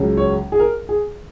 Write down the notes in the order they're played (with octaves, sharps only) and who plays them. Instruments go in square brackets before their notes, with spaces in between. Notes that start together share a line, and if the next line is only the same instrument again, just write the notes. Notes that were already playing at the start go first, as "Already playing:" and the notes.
Already playing: [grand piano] C#2 C#3 F#3 C#4
C#5
G#4
A#4
G#4